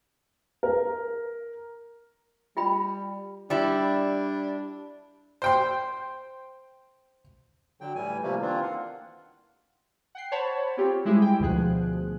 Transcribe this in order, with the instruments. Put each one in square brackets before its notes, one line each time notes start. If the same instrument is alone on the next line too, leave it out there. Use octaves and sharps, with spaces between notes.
[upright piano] A#4
[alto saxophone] G3 [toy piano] F4 G5 B5
[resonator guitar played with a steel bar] G3 E4 [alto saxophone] D4
[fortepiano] C5 G5 C6
[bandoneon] D3 F#3 G5
A2 E3 G3 G#5
C3 E3 F3 G3 A3 A#3
D#3 E3 A#3 C4 D4 F4
F5 F#5
[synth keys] F#5 G5 C7
C5 C#5 F#5 A5 B5
C4 F4 G4 C#5
G3 G#3 E4 G4 G#4
G5
D2 B2 F3 G#4 F#6